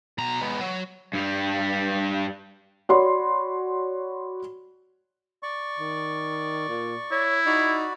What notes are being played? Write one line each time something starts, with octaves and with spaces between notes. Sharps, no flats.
B2 A#5
G#3 B3
F#3
G2 G3
F#4 C#5 D5 B5 C6
D5 C#6
D#3
A#2
E4 C#5
D#4 F#4 D5 B5